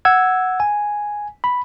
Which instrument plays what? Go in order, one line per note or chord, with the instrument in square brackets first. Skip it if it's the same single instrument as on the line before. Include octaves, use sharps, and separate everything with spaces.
[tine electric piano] F#5 E6 G#6
G#5
B5